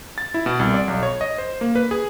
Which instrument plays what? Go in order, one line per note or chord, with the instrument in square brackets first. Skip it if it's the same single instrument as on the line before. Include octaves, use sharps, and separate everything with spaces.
[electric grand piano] A6
E4
B2
C2
D5
B1
C#5
D#5
C5
A#3
B4
G#4